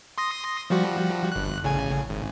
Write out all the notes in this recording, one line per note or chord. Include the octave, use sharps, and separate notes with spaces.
C6 D#6 A#6
F3 G3 F#4
G1 F#6
A1 C#3 G#5
G#1